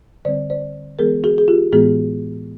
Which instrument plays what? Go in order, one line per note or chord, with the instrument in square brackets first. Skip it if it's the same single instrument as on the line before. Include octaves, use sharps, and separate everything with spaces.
[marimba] D3 G3 C4 C5 D5
C5 D5
E3 G#3 B3 G#4 A#4
F#4 G#4
G#4
F4 G4
A2 E3 G#3 B3 F#4 G#4